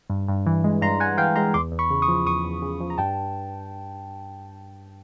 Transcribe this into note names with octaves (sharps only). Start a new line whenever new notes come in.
G2
G2
E3
G#3
G2 A#5 C6
G2 F#5 G#5
E3 F5 G5
G#3 A#5 C6
E2 C6 D6
E2
B5 C#6
C#3
C#6 D#6
F3
E2 C#6 D#6
E2
C#3
F3
A#5
G2 G5 A5